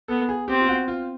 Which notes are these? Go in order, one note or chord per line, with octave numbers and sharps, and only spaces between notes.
B3 A4
G#4
C4 G4
F4
F#4
F4